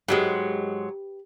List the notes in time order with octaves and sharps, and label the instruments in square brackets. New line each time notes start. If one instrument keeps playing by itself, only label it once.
[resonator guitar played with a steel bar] G#2 F#3 G#3 [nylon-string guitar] G4 B4